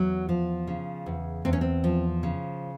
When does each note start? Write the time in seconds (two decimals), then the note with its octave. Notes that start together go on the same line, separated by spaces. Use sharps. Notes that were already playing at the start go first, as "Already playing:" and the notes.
Already playing: E2 F#3
0.29 F3
0.67 C#3
1.06 E2
1.45 E2 C4
1.53 C#4
1.61 C4
1.84 F3
2.23 C#3